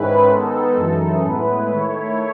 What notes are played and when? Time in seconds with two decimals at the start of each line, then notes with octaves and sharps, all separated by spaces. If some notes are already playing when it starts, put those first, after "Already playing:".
Already playing: G#2 D#3 G#3 C#4 E4 B4
0.27 D#3 G#3 B3 D#4 A4
0.76 F#2 E3 G#3 D#4
1.24 A2 G#3 B3 E4 B4
1.72 D#3 A3 E4 C#5